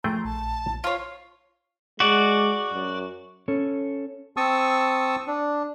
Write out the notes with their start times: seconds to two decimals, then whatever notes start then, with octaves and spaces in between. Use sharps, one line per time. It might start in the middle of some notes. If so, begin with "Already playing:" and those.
0.04 F3 A3 G#4 G5 A#5 C6
0.25 A#1 A5
0.84 F4 C#5
2.00 G#3 F#4 D5
2.73 F#2
3.48 C#4 A4 C#5
4.37 C4 A5 C#6 D#6 E6
5.27 D4